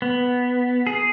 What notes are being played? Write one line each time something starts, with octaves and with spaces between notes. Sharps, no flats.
B3
G#4